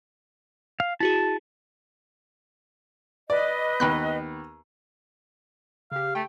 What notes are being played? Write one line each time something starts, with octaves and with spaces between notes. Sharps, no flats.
F5
E4 F#4 G#4 A5
B4 D5 D#5
D#2 B3 G5 B5 F#6
C#3 G4 F5
A3 G5